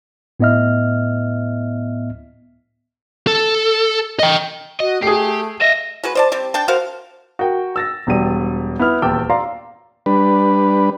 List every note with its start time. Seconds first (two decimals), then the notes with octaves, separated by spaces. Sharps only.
0.40 A2 B3 E4 D#5 E5 F6
3.27 A4
4.19 D#5 G5
4.80 F#4 D#5
5.02 A3 G4 G#4 C7
5.61 D#5 E5 A#6
6.04 G#3 F#4 B4
6.15 C5 D5 A5
6.32 G3 C4 G4
6.54 D4 G5 A5
6.68 F#4 A#4 C5 F5
7.39 F#4 A#4 G5
7.76 E6 A6 A#6
8.07 E1 E2 G3 D#7
8.79 B3 E4 B4 F6
9.02 D#1 E2 G5 A5 D6 E6
9.30 D5 F5 A#5 C6
10.06 G3 D4 B4